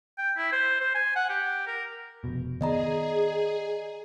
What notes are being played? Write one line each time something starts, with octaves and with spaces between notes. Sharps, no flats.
G5
E4
C5
C5
G#5
F#5
G4
A#4
F1 B2
D#3 B3 G#4 D5 D#5 A#5